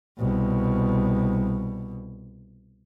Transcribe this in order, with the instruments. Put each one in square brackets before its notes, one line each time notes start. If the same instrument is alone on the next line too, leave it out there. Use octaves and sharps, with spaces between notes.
[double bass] C2 B2